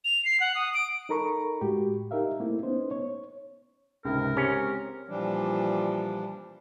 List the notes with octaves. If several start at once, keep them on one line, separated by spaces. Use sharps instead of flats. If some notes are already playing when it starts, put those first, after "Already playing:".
F7
C7
F#5
D#6
D7
D#4 A4 A#4 A#5 B5 C#6
A2 G#3 F#4 G4
D#4 G4 A#4 E5 F5
A3 A#3 C4 E4
B3 C#4 D#4 C5
C#5
C#2 G#2 C3 A#4
G#3 C4 C#4 G4
A#2 E3 F3 G3 D4